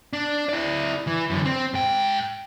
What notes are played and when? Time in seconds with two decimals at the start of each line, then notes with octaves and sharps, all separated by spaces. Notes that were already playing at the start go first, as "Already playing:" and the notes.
0.13 D4
0.49 E4 D5
1.07 E3
1.30 F#2 D3
1.45 C4
1.74 G#2 G5